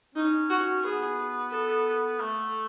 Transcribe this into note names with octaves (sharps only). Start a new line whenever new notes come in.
C#4 D#4
F#4
B3 G#4
A4
A3